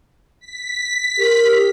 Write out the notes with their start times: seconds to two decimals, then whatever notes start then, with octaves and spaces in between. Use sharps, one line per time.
0.40 B6
1.18 G4 A#4